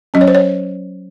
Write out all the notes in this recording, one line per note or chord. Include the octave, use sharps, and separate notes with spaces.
F#3 C#4 D#5
C#5
C5
C#5